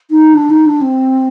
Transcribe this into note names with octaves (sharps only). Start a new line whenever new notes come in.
D#4
D4
D#4
D4
C4